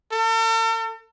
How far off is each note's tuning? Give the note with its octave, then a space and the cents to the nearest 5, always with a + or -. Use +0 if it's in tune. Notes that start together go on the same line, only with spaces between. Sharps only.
A4 +45